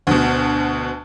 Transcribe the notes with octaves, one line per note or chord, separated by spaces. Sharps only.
D2 B2